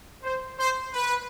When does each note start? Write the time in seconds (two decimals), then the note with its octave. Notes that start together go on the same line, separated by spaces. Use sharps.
0.23 C5
0.59 C5
0.93 B4